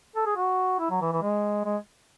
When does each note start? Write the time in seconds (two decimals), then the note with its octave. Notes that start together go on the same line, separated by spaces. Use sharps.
0.16 A4
0.26 G#4
0.36 F#4
0.79 E4
0.90 F#3
1.01 E3
1.12 E3
1.22 G#3
1.65 G#3